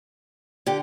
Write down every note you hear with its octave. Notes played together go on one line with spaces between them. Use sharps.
D3 G4